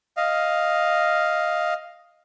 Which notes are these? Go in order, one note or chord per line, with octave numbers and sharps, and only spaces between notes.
D#5 F5